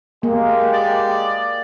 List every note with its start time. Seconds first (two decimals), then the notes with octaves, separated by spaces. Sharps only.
0.23 G#3 A#3 G4
0.73 D5